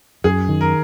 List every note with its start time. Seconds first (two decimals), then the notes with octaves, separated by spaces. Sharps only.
0.24 F#2 G#4
0.49 D#3
0.61 A#4